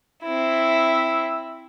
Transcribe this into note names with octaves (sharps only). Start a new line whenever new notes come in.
C4 E4 E5